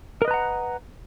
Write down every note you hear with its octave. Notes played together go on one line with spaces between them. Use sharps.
A#4 B4 D#5 F#5 A#5